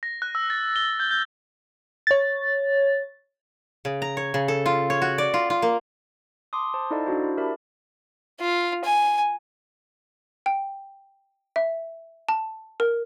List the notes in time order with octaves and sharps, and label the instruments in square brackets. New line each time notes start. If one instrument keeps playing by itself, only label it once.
[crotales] A#6
F#6
E6
A6
G7
G6
G6
[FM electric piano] C#5 A6
[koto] C#3
A#5
C#5
C#3
A4
F4
C#5
F#4
D5
F4
F4
A#3
[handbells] A5 C6 D6 D#6
C5 A5
D#4 E4 A4 D5 D#5 F5
D4 E4 F#4 C5
E4
G4 A#4 D5 E5 A5 B5
[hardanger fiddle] F4
G#5
[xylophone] G5
E5
A5
A#4